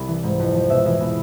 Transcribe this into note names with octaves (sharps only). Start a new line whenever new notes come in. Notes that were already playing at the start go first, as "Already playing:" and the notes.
Already playing: C2 B5
E3
G#2
F2
F3
B2 E5
E2 E5
B2 B5